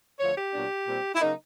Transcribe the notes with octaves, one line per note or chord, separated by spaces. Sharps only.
D2 D3 F3 A3 C#5
G4
A#2 F#3 B3 D4
A#2 G3 C4
E4
C#3 F#3 A#3 D#4